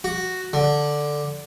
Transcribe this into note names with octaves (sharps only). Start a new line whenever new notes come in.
F#4
D3